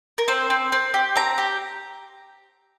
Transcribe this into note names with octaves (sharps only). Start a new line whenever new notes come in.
A#4
C4 C5
C4
C4
G4
C4 A#5
G4